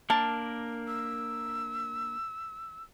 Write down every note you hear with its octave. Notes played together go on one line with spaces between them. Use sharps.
A#3 D4 A#4 A5
E6